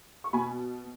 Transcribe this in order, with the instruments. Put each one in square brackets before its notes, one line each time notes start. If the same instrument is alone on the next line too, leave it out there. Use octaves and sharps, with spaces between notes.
[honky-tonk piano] C#6
B2 G#5 B5